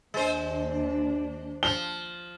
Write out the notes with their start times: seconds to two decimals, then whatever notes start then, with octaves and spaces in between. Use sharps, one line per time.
0.14 D#2 G#3 D4 C5
1.63 F3 G7